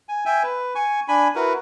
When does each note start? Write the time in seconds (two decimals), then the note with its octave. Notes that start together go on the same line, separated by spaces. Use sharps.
0.09 G#5
0.26 E5 G5 G#5
0.43 B4
0.75 G#5 C#6
1.08 D4 G#5 B5
1.35 E4 F#4 A#4 B4